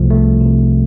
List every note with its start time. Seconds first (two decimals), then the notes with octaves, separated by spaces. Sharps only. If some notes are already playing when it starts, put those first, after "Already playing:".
Already playing: C2 C3 F3 A3
0.10 A3
0.41 C3